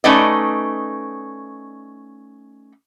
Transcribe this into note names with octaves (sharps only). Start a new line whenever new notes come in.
A3 C#4 D#4 B4 D5 D#5